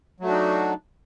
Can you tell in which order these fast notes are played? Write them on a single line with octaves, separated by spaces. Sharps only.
F#3 A3 F#4 D4 D#4